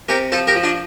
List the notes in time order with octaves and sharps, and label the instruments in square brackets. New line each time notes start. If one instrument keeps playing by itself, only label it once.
[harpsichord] C3 G4 A#4
F3 A4 C5
G4 A#4
F3
D4 F4